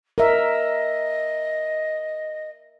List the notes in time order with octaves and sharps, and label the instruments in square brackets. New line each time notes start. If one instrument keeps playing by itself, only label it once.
[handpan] A#4 E5 [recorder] D#5